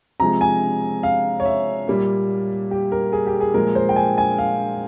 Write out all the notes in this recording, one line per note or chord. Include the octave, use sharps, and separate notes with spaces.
C3 F3 G#3 A#5
G#5
F5
C#5
E5
A#2 G3 A#3
G4
A#4
G#4
G4
G#4
A#2 F3 G#3 A#4
C5
G5
G#5
G#5
F5